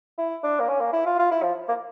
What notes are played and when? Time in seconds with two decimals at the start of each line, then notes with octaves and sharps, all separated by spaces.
0.18 E4
0.43 D4
0.60 A#3
0.69 C#4
0.80 A#3
0.93 E4
1.06 F4
1.19 F4
1.31 E4
1.43 F3
1.68 A#3